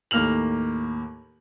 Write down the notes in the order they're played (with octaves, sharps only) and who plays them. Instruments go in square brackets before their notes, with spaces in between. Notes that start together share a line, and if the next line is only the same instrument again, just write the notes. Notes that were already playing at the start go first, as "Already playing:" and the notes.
[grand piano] D#2 A2 A#3 F6 F7 F#7